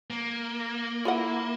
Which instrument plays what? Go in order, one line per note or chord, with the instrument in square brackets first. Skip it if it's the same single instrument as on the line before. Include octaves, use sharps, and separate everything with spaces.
[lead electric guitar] A#3
[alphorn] E4 [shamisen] F4 A4 F#5